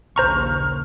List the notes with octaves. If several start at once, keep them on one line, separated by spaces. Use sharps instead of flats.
A#1 D#2 C#3 C5 A#5 C#6 F6